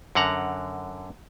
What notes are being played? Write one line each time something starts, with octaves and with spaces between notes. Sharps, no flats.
F#2 D3 F#5 A#5